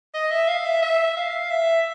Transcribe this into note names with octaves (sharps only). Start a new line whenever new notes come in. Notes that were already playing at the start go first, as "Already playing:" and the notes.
D#5
E5
F5
E5
E5
F5
E5